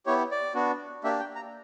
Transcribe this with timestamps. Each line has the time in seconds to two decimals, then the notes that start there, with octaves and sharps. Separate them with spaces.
0.06 B3 E4 G4 C#5
0.31 D5
0.54 B3 D4 F#4
1.04 A#3 D4 G4 E5
1.20 G5
1.36 A#5